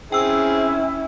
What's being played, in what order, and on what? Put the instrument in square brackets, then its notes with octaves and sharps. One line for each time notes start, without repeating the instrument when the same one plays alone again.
[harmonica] C4 G#4 [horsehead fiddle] C#4 E4 [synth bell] G5 E6